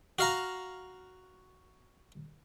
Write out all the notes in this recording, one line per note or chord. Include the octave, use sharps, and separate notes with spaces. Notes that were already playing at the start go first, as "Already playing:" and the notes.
F#4 F5 A#5